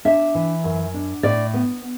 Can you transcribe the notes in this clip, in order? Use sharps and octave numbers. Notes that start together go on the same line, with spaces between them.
D4 E5
E3
F#2
D4
A2 D5
B3